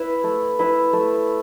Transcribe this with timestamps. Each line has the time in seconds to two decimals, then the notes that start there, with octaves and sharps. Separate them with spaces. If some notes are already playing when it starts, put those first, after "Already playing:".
Already playing: E4 B4 E5
0.24 A3
0.59 E4 B4 E5
0.93 A3